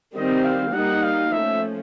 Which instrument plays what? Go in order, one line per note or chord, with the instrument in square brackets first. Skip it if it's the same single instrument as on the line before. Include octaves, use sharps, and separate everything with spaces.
[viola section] D#3 G3 C4 [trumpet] D#5
[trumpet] F5
[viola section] G3 A#3 D#4 [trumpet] F#5
[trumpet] F5
[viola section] F3 A3 C#4 [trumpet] E5